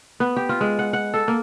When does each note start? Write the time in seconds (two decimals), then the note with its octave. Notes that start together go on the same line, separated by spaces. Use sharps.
0.20 B3
0.36 G4
0.49 F4
0.61 G#3
0.79 F#5
0.93 F#5
1.14 A4
1.28 A#3